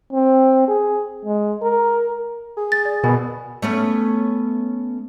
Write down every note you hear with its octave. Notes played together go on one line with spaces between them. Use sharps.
C4
G#4
G#3
A#4
G#4
A6
D5
B2 A#4 G#5 B5
A3 B3 C#4